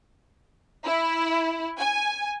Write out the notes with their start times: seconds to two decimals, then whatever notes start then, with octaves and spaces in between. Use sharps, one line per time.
0.84 E4
1.78 G#5